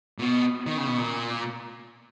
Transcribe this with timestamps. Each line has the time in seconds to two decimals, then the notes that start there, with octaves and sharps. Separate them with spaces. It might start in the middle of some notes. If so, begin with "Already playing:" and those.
0.19 A#2
0.22 B2
0.66 D#3
0.77 C#3
0.87 B2
0.98 A#2